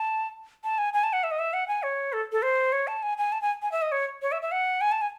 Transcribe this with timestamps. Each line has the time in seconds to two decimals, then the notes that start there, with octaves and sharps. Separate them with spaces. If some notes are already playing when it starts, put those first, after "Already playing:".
Already playing: A5
0.64 A5
0.78 G#5
0.93 G#5
1.04 A5
1.13 F#5
1.24 E5
1.31 D#5
1.39 E5
1.53 F#5
1.68 G#5
1.83 C#5
2.13 A4
2.32 A4
2.42 C5
2.72 C#5
2.87 A5
3.03 G#5
3.18 G#5
3.32 A5
3.42 G#5
3.62 G#5
3.72 E5
3.82 D#5
3.92 C#5
4.22 C#5
4.32 E5
4.42 E5
4.52 F#5
4.81 G#5
4.92 A5
5.01 G#5